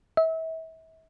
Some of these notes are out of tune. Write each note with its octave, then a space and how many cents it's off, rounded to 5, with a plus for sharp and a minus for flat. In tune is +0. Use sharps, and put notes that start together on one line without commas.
E5 -35